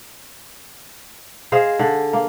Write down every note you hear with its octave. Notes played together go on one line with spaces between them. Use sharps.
G#4 C5 D#5 F5
D3
A#3